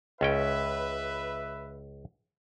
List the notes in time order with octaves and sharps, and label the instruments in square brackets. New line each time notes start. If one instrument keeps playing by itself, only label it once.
[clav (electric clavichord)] C#2 C#4 G5 [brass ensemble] B4 E5